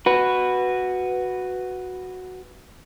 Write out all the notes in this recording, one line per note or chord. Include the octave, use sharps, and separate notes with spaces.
F#4 B4